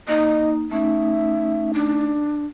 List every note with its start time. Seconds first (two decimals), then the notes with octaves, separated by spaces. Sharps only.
0.08 A#3 D#4 D#5
0.71 A3 C#4 D#4 E5
1.74 D4